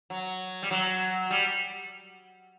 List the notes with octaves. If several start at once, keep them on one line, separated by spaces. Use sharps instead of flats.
F#3
G3
F#3
G3